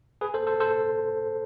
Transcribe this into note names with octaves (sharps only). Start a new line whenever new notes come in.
G#4 B4
A4 C5
A4 C5
A4 C5